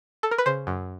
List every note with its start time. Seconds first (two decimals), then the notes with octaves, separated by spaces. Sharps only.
0.23 A4
0.31 A#4
0.38 B4
0.46 C#3 C5
0.67 F#2